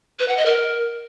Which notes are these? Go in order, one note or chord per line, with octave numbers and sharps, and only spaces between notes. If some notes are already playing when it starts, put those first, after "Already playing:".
B4
F#5
D#5
A#4